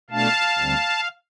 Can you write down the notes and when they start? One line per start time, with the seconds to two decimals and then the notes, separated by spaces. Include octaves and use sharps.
0.10 B2 A3 D4 F5 A5
0.58 D2 D3 G3 C4